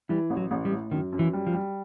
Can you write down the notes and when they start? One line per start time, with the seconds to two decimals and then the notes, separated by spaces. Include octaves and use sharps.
0.09 E3 G3
0.30 A1
0.37 F#3
0.51 A1
0.65 G3
0.71 A2
0.91 F#2 D#3
1.12 F#2
1.19 E3
1.33 G3
1.47 F3
1.54 G3